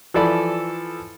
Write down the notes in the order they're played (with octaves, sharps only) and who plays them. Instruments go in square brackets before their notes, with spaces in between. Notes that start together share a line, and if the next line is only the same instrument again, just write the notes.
[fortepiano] E3 F3 A4 D5 B5